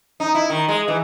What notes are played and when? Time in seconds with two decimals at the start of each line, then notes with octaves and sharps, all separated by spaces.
0.20 D#4
0.35 E4
0.50 D#3
0.69 G#3
0.88 E3